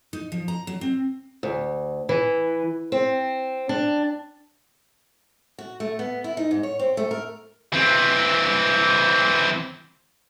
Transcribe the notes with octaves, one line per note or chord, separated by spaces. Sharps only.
D#4
F3
A#5
F#3
C4
D2
E3
C4
D4
F#4
A3
B3
E4
D#4
G#2
C#5
C4
A3
A#4
E3 C4